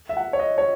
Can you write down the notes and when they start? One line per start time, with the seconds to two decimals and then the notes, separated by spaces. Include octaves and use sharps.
0.09 E5
0.17 F#5
0.33 C#5
0.39 D#5
0.58 C#5